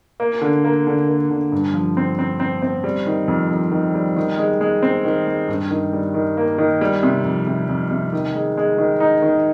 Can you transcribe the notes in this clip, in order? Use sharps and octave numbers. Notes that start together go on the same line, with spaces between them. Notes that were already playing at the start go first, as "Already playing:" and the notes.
A#3
D3
A#3
D3
A#3
D3
G2
F3
C4
C4
C4
C4
G3
D#3
F2
F2
D#3
G3
D#3
G#3
G#3
C4
D#3
G#3
G2
D#3
G3
D#3
A#3
D#3
G3
C3
F2
C3
F2
C3
D#3
G#3
G#3
D#3
D#4
D#3